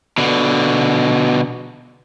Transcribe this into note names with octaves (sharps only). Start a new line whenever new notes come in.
B2 D3